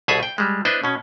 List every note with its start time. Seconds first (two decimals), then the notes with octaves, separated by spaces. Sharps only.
0.08 C2 B2 G#4 A4 E5 G#5
0.23 G5
0.38 G3 G#3
0.65 B3 D4 E4 B4 C5 D#5
0.84 B2 C#4